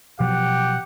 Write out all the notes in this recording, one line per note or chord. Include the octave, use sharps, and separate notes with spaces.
B2 F3 F#3 G4 F#5